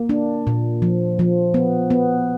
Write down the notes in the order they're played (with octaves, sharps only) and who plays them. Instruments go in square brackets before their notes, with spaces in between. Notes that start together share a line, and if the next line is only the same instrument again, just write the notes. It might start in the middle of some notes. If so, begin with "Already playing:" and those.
Already playing: [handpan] A#3
D4
A#2
F3
F3
B3
B3